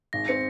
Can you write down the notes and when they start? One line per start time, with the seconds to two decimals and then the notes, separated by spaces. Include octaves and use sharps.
0.13 G#1 A#6
0.28 C4 C#7